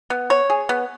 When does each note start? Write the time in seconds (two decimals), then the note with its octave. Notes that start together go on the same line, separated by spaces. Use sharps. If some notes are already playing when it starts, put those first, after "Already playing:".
0.10 B3
0.30 C#5
0.50 G#4
0.69 B3